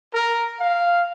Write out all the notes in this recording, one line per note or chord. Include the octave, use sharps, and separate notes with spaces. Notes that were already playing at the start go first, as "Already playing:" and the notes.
A#4
F5